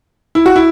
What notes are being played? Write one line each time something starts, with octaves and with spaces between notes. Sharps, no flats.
E4
F#4
E4